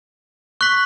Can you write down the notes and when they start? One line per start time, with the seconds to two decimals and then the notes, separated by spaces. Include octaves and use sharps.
0.61 C#6 F#6 B6 F#7